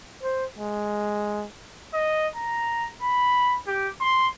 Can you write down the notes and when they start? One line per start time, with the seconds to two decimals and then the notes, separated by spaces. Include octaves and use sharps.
0.23 C5
0.59 G#3
1.94 D#5
2.35 A#5
3.02 B5
3.67 G4
4.00 C6